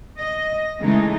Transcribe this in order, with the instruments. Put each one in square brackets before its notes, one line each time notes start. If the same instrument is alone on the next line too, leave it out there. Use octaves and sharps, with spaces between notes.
[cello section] D#5
C#3 E3 G#3 A3 D#4